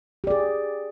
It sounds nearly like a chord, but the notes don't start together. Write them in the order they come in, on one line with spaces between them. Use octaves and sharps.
G4 D5 G#4